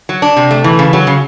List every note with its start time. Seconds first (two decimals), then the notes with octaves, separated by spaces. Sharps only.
0.09 F#3
0.22 D4
0.37 C3
0.51 A3
0.64 E3
0.79 C#3
0.93 F#3
1.07 C#3